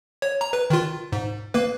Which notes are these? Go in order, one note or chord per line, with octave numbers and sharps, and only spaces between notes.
C#5
A#5
B4
D#3 F4
G#2
A#3 B4